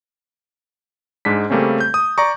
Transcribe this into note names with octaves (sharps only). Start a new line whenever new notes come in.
G#2 G#3 D4 B6
C#3 G3 A3 A#3 C4 C#4
G6
D#6
D5 A#5 C#6